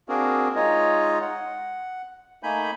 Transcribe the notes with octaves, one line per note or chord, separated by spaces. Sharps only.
A#3 C4 D4 F#4 G#4 A#4
G#3 D#4 F4 C#5 D#5
F#5
A3 A#3 D#4 G#5 B5 G6